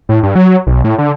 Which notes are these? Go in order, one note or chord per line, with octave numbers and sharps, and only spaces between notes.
A2
G2
F#3
B1
A2
D3